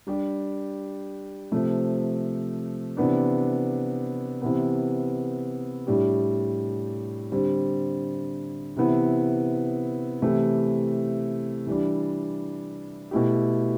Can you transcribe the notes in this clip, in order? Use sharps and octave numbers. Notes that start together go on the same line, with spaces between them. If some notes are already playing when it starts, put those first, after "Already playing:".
G3 D4 G4
C3 F3 A3
C3 E3 B3 D4
C3 E3 B3
A2 G3 D4 G4
D3 G3 C4
C3 E3 B3 E4
C3 E3 A3 E4 G4
E3 G3 D4
B2 A3 E4 G4